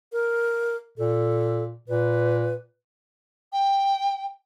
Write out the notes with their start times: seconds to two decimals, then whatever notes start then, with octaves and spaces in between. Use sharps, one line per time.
0.13 A#4
0.98 A#2 A4
1.88 A#2 B4
3.52 G5